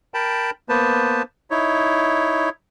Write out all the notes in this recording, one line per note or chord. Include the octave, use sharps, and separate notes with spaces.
A#4 G5 A5 B5
A#3 B3 B4 C5 A5
D#4 E4 C#5